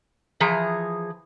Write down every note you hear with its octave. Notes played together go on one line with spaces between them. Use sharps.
E3 F3 G#4 A#5